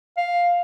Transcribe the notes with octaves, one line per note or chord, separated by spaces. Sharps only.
F5